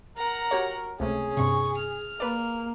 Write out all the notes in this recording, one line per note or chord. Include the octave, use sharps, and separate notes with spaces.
A#4 F#5 A#5
F#4 G4 C#5
C#2 C3 A3 C#4 G#4
G2 C3 C#6
F6
A#3 B4 D5